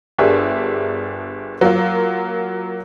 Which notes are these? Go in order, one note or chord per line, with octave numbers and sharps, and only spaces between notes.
G1 D4 G4 G#4 A#4 E5
F#3 A#3 F4